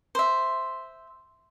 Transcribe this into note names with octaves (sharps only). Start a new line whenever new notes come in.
C5 E5